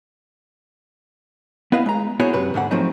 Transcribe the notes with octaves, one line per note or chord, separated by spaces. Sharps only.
B3 E4 B4 D#5 F5
G#3 A#5
B3 E4 F#4 G#4 C5 C#5
F#2 C3 B4
D2 G#2 D3 F#5
F3 F#3 A3 C4 D#4